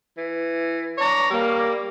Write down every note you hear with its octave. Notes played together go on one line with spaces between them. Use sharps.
E3
D4 C#5 D5 A#5
G3 A#3